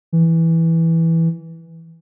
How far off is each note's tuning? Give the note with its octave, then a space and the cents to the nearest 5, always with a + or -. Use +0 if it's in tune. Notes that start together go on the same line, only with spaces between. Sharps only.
E3 -5